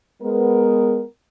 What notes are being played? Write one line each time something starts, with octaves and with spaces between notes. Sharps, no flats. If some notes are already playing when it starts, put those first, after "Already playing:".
G#3 B3 A#4